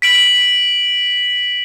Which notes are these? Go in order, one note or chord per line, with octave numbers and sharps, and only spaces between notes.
B6 D7 F#7